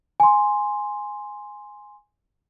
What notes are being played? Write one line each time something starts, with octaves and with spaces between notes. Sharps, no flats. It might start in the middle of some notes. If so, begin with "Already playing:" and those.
G#5 C6